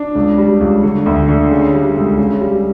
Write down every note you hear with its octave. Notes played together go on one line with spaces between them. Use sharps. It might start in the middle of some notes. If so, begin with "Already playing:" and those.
Already playing: D4
C#2
G3
C#2
D3
D2
D3
C#3
G3
C#2
C#3
G3